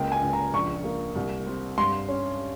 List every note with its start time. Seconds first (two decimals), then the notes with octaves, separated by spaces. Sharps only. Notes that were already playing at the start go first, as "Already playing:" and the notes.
Already playing: C#2 A#3 G5
0.12 G#5
0.22 C#2
0.33 A#5
0.53 A#1 C#6
0.84 A#3
1.16 C2
1.47 C4
1.77 G2 C6
2.09 C#4